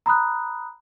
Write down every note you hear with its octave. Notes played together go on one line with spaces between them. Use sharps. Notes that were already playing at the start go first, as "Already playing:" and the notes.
A#5 B5 D#6 F#6